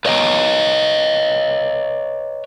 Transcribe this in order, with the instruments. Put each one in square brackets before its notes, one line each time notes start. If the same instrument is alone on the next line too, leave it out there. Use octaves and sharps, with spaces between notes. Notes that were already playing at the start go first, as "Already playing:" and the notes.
[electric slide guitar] B4 C#5 D#5 E5 G5 A#5